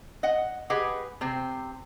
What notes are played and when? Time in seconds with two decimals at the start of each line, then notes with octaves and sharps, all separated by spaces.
0.23 D#5 F#5
0.70 G4 G#4 B4 D#5 F#5
1.21 C3 C4